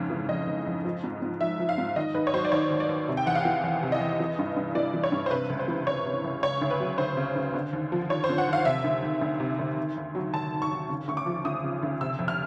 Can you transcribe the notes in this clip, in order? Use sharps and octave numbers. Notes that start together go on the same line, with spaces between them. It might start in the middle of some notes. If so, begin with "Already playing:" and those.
Already playing: F2 G#2 C#3
E3
F2 D#5
C#3
F2
F3
G#2
G#2
F3 E5
F3
F5
G#2
D#3 D#5
D#2 B4
C#5
F#3 C5
D5
D#2 C#5
D#3
D5
D#2
C3
G5
E2 F#5
F5
E3
E2
C3
D#5
E2
E3
G2
G2
E3 D5
E3
C#5
G2
C5
C3 B4
C#2
C5
E3
C#2 C#5
C3
C#2
C#3 C#5
D2
B4
F#3
D2 C5
C#3
D2
D3
D#2
F3
D#2 C#5
C5
D3
F#5
D#2 F5
C3 E5
D2
D#3
D2
C3
D2
D#3
D#2
F#3
D#2 A5
D#3
C#6
D#2
C#3
D2 C#6
D6
F3
D2 D#6
C#3
D2
C3 E6
F2
F6